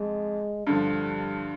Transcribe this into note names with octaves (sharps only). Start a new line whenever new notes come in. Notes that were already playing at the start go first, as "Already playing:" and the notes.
Already playing: F2 F3 G#3
G2 D3 F3 G3